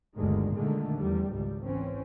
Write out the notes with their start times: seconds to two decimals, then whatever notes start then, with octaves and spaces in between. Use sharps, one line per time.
0.16 G1 D2 D3 D#3 G#3
0.55 A#2 D3 D#3 G#3 A3
0.96 E2 G3
1.31 G#1 C#2 G3
1.63 E3 C4 C#4